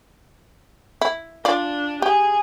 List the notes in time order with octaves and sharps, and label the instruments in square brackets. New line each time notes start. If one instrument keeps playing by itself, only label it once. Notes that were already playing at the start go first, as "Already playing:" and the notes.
[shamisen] E4
[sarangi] D4 [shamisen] F4 D5
[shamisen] G4 [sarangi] G#4